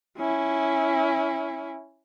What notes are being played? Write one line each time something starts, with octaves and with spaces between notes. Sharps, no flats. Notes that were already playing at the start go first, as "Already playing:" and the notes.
C#4 E4